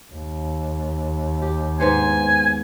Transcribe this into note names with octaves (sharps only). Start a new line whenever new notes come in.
D#2
G4
G#2 B3 C5 G#5